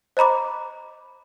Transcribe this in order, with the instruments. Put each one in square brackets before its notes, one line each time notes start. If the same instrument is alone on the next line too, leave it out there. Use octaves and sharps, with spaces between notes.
[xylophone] C5 D#5 A#5 B5 D6